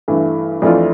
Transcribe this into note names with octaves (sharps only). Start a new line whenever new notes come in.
G2 E3 A3
F2 E3 A3 D4 F4